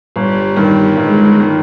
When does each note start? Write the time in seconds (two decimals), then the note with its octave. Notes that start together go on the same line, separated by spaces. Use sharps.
0.16 G1 G3
0.56 G2 D#3
0.97 G1 G#3
1.40 D#3